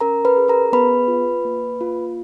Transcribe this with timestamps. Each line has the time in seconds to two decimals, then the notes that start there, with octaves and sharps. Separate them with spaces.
0.01 C#4 A#4 A#5
0.25 B4 B5
0.37 G#4
0.48 A#4 A#5
0.73 B3 B4 B5
1.08 F4
1.45 A#3
1.81 F4